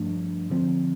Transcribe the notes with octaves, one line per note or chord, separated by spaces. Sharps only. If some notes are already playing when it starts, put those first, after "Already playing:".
Already playing: G2 F3 A3 D4
D3 F3 C4